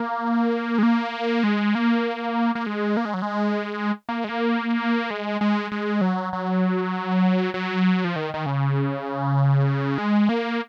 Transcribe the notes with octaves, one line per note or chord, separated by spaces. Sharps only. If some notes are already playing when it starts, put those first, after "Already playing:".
Already playing: A#3
G#3
A#3
G#3
A#3
A#3
G#3
A#3
G#3
F#3
G#3
A#3
G#3
A#3
G#3
G#3
G#3
F#3
F#3
F#3
F3
D#3
D#3
C#3
G#3
A#3